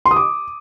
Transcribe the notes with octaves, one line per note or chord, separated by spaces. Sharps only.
C6
D#6
D6